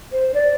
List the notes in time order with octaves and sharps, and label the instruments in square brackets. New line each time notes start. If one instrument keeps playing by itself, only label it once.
[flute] C5
D5